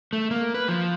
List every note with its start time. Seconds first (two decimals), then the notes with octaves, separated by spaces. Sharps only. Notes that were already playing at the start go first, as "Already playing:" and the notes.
0.13 A3
0.31 A#3
0.54 B4
0.68 F3